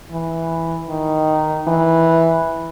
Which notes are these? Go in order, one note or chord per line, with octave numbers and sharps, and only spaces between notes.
E3
D#3
E3